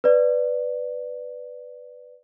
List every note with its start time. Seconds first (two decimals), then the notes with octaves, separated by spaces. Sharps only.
0.04 B4 D5